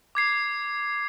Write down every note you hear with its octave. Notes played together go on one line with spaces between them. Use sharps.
D6 G#6 C7